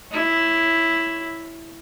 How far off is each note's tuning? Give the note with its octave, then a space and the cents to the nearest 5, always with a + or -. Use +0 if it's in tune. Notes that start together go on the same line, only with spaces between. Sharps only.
E4 +0 C#5 +0